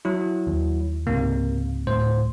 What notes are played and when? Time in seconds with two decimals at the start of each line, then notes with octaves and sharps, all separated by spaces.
0.05 F#3 E4
0.47 D#2
1.07 C#2 G#2 C3 A#3
1.87 D1 A2 C5